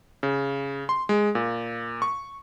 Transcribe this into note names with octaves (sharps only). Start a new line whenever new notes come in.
C#3
C6
G#3
A#2
C#6